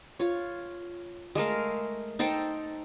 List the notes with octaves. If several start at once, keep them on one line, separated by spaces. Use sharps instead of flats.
F4 C#5
G#3 A3 A#4 F5
D#4 A4 C5 G5